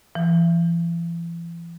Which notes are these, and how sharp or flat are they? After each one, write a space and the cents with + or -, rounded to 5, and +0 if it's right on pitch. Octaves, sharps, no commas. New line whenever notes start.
E3 +40